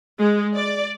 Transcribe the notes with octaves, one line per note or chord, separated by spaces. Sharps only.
G#3
D5